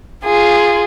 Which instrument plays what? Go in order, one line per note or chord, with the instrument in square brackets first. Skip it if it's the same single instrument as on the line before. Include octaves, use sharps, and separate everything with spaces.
[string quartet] F4 G#4